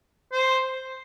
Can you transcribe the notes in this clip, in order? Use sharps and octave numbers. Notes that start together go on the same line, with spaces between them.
C5